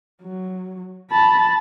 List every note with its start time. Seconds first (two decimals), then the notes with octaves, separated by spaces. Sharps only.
0.22 F#3
1.11 A5 B5